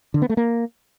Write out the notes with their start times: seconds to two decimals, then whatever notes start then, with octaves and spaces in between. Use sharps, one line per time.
0.14 D3
0.22 B3
0.29 A3
0.37 A#3